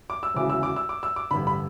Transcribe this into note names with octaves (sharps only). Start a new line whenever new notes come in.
D6
E6
E1 D2 C#3 E3 D6
E6
D6
E6
D6
E6
D6
A1 G2 D3 B5
B5